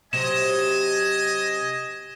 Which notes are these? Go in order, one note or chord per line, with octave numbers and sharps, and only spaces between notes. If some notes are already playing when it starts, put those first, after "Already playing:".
C3 F#3 D#5 G#5 E7